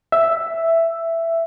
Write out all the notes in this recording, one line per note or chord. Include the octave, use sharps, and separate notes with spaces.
E5